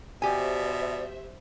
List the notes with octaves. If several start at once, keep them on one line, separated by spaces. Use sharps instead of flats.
B2 G4 C5 D5 E5 G#5